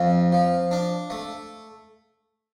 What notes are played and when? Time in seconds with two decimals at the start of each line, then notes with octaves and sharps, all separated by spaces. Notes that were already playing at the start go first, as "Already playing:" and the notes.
Already playing: F2 F4
0.32 F3
0.71 D4
1.10 A3